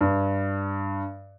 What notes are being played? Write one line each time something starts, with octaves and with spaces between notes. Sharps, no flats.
G2